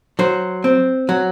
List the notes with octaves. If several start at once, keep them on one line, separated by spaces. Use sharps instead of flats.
F#3 C5
C4
F#3